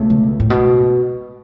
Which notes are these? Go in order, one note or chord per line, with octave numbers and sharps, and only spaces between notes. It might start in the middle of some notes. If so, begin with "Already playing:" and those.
Already playing: C#2 B2 A3
D3
A2
B2